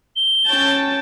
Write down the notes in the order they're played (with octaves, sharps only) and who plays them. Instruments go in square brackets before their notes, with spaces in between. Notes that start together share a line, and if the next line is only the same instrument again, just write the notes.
[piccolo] G7
[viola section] C#4 G5 A5